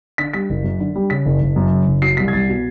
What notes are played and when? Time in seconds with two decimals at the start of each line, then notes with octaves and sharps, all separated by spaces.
0.18 D3 B6
0.34 G3 B6
0.50 F#1
0.64 F#2
0.80 D3
0.96 G3
1.10 C#3 B6
1.26 F#1
1.41 F#1
1.56 F#2
1.72 C#3
1.87 F#1
2.02 F#3 C7
2.17 C2 B6
2.28 G#6
2.33 C2 A6
2.49 B2